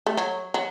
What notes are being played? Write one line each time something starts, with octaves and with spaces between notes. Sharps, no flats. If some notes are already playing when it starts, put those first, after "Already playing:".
A3
F#3
F#3